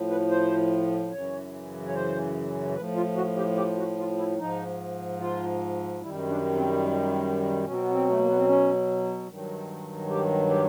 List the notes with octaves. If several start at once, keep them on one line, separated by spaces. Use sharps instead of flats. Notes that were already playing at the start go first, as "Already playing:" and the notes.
Already playing: A2 F3
B4
C5
F#2 C#3 E3 C#5
C#5
C5
A2 F3 B4
F4
F#4
G4
G4
F#4
F4
E4
G#2 F3 D#4
F4
F#2 D#3 G3 E4
D4
C4
B2 F#3 C#4
C4
B3
C4
A3
A#3
B3
C4
C#4
G2 D#3 F#3
G4
G4